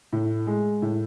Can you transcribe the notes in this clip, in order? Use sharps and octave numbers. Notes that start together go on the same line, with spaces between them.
A2
G#3
A2